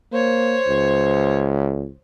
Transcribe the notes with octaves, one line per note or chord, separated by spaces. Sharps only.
A#3 C5 C#5
C#2